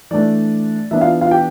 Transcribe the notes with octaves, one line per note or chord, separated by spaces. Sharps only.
E3 A3 D4 D5
E3 B3 D4 E5
F4 F5
F4 F5
G4 G5